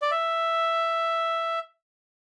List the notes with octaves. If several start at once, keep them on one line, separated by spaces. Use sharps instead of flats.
D5
E5